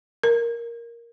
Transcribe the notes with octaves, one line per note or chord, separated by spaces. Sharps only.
A#4